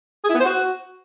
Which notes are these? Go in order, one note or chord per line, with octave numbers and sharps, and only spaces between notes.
G#4
E4
B3
C5
F#4